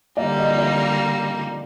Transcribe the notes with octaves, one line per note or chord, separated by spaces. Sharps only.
D3 G3 A#3 D5
D#5
D5